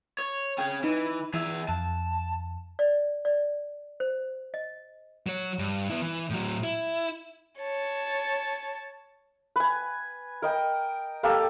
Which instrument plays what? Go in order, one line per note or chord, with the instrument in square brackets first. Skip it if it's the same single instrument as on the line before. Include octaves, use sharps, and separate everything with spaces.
[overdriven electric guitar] C#5
[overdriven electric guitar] C#4 G#4 [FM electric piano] G5
[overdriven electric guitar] E3 [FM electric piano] D#4
[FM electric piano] E3 [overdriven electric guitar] G#4 E5
[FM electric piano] F2 [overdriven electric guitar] A5
[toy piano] D5
D5
C5
D#5
[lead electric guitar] F#3 C#5
G2
B3 E4
E3
A2 F#3
E4
[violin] C#5 A5
[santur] B4 G#5
A#4 D#5 G5
A#3 G4 A4 A5